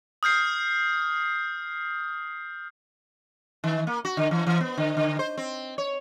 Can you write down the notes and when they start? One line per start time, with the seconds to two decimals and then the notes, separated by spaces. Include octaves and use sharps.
0.23 D#6 F6 G6 C7
3.64 D#3
3.87 A#3
4.05 F#4
4.17 D3
4.31 E3
4.47 E3
4.61 B3
4.78 D3
4.97 D3
5.19 C5
5.37 C4
5.78 C#5